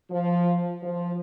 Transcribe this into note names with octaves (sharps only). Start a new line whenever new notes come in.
F3
F3